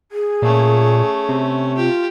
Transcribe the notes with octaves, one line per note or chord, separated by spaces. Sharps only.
G#4
A#2 A3 C#4
C3
F4 G4